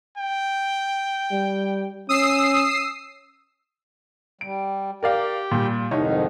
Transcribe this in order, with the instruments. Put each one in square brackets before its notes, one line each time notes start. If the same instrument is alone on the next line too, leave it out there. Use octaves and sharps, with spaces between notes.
[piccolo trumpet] G5
[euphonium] G3
[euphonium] C#4 [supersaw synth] D#6 E6 C7
[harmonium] G3 [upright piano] D7
[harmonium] G4 G5 [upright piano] A#4 D5 F5
[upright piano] A#2 G3
[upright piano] C2 D#4 C#5 [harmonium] F2 G#2 D#3